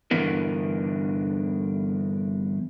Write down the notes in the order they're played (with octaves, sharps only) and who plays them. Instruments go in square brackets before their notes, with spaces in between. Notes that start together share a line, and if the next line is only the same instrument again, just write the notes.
[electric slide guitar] G2 D3 E3 B3 A#4